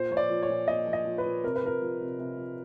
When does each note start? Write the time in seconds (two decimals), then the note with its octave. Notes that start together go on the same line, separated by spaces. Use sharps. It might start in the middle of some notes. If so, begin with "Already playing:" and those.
Already playing: A#2 C5
0.11 F3 C#5
0.17 D5
0.30 F3
0.43 C#5
0.49 A#2
0.68 A#2 D#5
0.87 F3
0.93 D#5
1.06 F3
1.18 B4
1.25 A#2
1.44 C3 A#4
1.56 B4
1.62 F3 A#4
1.82 F3
2.01 C3
2.19 C3
2.38 F3